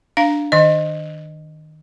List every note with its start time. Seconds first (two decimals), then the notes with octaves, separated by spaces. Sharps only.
0.17 D4 F5
0.52 D#3 D#5